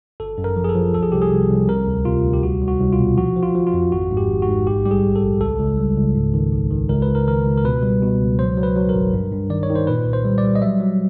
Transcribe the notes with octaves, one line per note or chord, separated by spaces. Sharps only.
G1 A4
F#2
A#4
F3
G#4
A4
F3
C2 A4
G#4
C2 G4
G#4
C2
C2
C3 A#4
D2
C3 F4
D2
G4
C2 F#4
C2
F#4
C2
F4
B2
F3 F#4
F3
F4
F3
F4
F2
G#1 F#4
G#2
G4
G#1
F#4
G#2
A#1 G4
G3 G4
G#4
A#1
A4
A#1
C#2 A4
C#2
G3
C#2
G#2
D#3
A#1
D#3
C#2 A#4
B4
C#2
A#4
D#3 A#4
C#2
A#4
B2 B4
G3
B2
C#2
F#3 C5
F#3
B4
F#3
A#4
G#1
G2
G2
D#3 D5
C#5
D#3
C5
A#2 B4
C2
C5
G3
D5
G3
D#5
F#3 E5
F#3